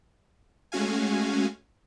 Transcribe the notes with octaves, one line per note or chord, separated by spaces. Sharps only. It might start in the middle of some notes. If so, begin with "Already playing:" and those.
G#3 A3 C#4 F#4 F5 G#5